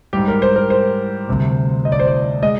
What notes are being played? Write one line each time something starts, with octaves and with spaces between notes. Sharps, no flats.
G#2 G3 G4
A#4
C5
A#4
C5
D2 C3 G3
D#5
D5
C5
D5
G#3 D#5